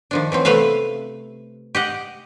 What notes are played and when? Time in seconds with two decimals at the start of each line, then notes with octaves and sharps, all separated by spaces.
0.11 D#3 F3 D4
0.32 E3 F#3 C4
0.45 C3 A3 B3 B4 E5 F5
1.75 G4 D#5 F#5